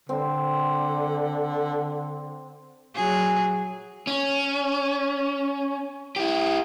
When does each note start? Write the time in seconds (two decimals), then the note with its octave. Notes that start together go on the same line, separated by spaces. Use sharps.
0.09 D3 C4
2.95 F#3 G#4
4.07 C#4
6.16 E4 G4